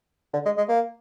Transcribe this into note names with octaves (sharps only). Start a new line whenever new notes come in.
D3
G#3
G#3
A#3